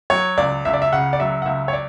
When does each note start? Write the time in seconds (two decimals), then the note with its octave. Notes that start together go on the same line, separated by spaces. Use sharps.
0.10 F#3 C#5
0.37 C#2 D5
0.65 C#2 E5
0.73 D5
0.82 E5
0.92 C#3 F#5
1.13 D5
1.20 F#3 E5
1.42 F#5
1.46 C#2 E5
1.68 C#5
1.73 D5